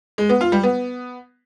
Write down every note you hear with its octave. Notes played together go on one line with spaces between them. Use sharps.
G#3
B3
F4
G3
B3